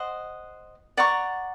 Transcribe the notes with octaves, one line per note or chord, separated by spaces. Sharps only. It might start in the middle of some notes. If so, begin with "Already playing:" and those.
Already playing: C5 D#5 F#5
D5 F#5 A#5 C#6